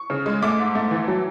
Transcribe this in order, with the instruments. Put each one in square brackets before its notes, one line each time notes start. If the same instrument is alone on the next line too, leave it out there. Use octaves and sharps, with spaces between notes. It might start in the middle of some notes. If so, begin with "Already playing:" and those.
Already playing: [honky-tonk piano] C#6
C#3
G#3
A3 D6
G#2
A3
E3
F#3